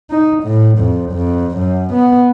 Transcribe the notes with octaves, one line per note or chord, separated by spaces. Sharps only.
D#4
A2
F2
F2
F#2
B3